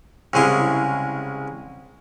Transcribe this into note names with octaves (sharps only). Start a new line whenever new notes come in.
C2 C#3 G#3 E4